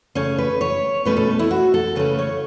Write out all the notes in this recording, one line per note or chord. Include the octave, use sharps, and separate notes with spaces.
C#3 A3 C#4 C#5
B4
C#5
B2 A3 C#4 B4
A4
E4
F#4
A4
C#3 A3 C#4 B4
C#5